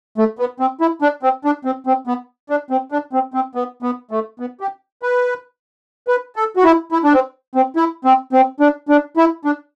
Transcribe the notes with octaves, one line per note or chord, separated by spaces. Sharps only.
A3
B3
C4
E4
D4
C4
D4
C4
C4
B3
D4
C4
D4
C4
C4
B3
B3
A3
B3
G4
B4
B4
A4
F#4
E4
E4
D4
C4
C4
E4
C4
C4
D4
D4
E4
D4